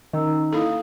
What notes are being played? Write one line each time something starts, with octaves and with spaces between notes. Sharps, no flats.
D#3 C#4 A#5 E6
A#3 E4 A4 F5 D#6